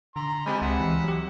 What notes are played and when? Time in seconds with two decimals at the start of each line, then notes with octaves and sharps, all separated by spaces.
0.16 D3 A#5 C6
0.46 G#3 C4 G4 D#5 G#5 B5
0.62 C#2 E5 F#5
0.80 E3
1.04 F#3 G4